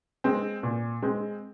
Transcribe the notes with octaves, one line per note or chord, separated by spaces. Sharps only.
G#3 C4
A#2
G#3 C4